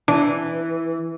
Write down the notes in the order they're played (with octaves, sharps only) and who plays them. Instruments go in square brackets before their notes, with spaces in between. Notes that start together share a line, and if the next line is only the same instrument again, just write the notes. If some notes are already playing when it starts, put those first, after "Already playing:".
[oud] E3 [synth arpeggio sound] D4